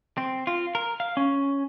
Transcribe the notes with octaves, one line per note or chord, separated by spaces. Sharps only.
C4
F4
A#4
F5
C#4